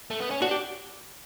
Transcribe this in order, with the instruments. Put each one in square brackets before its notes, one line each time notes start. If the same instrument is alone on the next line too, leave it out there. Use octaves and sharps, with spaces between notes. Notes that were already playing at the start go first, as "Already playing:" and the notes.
[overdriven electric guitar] A3
B3
C#4
[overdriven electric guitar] D4 [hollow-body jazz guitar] F#4
[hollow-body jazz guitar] G4